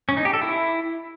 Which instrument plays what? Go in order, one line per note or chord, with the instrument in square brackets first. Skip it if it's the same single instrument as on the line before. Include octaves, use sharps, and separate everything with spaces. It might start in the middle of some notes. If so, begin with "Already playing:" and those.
[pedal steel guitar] C#4
D#4
G4
A4
E4